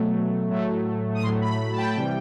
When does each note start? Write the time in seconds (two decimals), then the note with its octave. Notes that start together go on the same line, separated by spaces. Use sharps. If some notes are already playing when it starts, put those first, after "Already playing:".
Already playing: B2 F#3 A3
0.49 A2 F#3 A3
1.14 D#6
1.23 A2 C6
1.26 F#3 A3
1.41 B5
1.72 A5
1.78 G5
1.96 C3 E3 G3